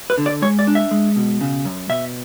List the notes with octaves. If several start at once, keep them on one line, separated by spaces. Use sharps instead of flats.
B4
D3
D5
G#3 C#5
D5
D4
E5
G#3
B2
C#3
F#2
B2 E5